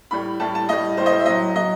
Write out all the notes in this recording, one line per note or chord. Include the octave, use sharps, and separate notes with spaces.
A2 G3 B5
A2 G3 A5
A5
A2 G3 D#5
A2 G3 C5
D#5
C5
E5
A2 F#3 D#5
A2 F#3 D#5